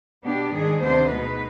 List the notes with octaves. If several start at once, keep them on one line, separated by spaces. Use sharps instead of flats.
B2 B3 D4 G4
G#2 D#3 G#3 D4 G#4
D2 C3 D#3 B3 D4 C5
B2 G#3 B3 D#4 B4